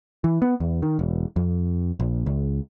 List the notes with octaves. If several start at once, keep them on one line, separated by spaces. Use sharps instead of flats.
E3
B3
E2
D#3
E1
F2
A#1
C#2